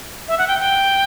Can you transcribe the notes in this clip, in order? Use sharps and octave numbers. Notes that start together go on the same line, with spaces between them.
E5
F#5
G5
G5